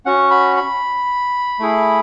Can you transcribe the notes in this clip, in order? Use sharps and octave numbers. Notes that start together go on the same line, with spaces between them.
C#4 F#4 F#5
B5
B5
A3 E4 G#4